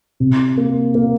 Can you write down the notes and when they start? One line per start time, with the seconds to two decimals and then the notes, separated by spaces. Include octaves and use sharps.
0.20 C3
0.57 A#3
0.95 A#3